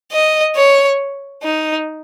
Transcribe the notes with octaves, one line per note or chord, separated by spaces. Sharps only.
D#5
C#5
D#4